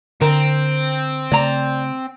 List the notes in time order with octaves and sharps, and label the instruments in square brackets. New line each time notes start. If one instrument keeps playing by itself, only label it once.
[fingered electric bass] D3 [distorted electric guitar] C4 [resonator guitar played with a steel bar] A#4
[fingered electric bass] C#3 A3 [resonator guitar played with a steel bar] D5 A#5